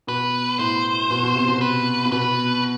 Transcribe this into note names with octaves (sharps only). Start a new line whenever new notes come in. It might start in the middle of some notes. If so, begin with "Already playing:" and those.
B2 B4
A2 C5
B2
B2
C3
B2
B4
C3
B2 B4